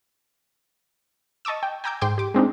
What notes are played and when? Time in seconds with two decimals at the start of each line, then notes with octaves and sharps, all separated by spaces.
1.45 D#5 A5 C#6 D6 E6
1.63 G5
1.84 G5 G#5 A#5 D6 E6 G6
2.01 G#2 G5 C6 D6 G6
2.18 G4 D6
2.34 G#3 C4 D4 D#4